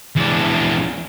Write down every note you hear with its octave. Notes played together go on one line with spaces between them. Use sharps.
E2 D4